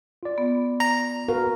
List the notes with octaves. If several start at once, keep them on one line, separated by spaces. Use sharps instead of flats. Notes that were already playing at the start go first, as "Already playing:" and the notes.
F4 D5
B3
A#5
F#4 A#4 B4 F5